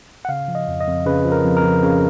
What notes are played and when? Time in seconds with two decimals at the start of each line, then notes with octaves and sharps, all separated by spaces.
0.25 F#5
0.29 C#3 F5
0.48 F3
0.55 D#5
0.68 F2
0.80 D#5
0.87 F2
1.05 C#3 B4
1.25 F3
1.32 A#4
1.45 F2
1.57 A#4
1.63 F2
1.83 C#3